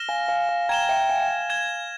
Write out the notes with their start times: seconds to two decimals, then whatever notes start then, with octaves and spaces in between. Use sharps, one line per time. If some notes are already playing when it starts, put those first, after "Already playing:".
Already playing: F6 A#6 E7 G7
0.09 F5 G#5
0.28 F5 G#5
0.49 F5 G#5
0.69 G5 A#5 G#6 E7 G7
0.89 E5 G5
1.09 F5 G#5
1.50 G#6 E7 G7